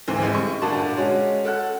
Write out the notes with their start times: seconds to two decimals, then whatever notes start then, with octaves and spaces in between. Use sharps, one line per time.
0.08 D2 G#2 E3 C4
0.22 A1 G3 G#3 D#7
0.34 C#6
0.62 G1 A#2 D4 F#4 A5
0.97 G#3 C#4 F#4
1.45 A4 F#5 F#6